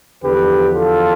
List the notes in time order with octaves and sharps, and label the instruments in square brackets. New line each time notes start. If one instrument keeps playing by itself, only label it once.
[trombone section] E2 D3 F3 G4 B4
F4 A4